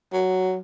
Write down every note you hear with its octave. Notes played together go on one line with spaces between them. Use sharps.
F#3